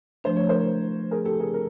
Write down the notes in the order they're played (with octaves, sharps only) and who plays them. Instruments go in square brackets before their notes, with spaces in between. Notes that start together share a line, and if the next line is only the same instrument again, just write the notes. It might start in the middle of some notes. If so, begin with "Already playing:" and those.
[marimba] F3 A3 D4 [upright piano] C5
[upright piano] C#5
A#4 C5
G#4 A#4
G4 A4
G#4 A#4
A#4